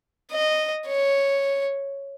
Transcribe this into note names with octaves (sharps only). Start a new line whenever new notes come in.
D#5
C#5